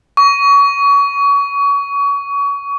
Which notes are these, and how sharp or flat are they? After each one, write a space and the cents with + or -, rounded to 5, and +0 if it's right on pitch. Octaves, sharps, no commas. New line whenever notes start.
C#6 +30